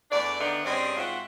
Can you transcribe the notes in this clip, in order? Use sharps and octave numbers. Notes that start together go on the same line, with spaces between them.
E2 A3 D4 D5
D3 D#3 A3 B3 D4 D#4
G2 C4 C#4 G#4 D5 D#5
G#2 C4 F4 F#4 E5 F#5